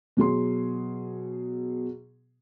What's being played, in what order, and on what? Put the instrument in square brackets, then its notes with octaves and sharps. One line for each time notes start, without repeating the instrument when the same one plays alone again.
[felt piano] B2 F#3 G#4 C6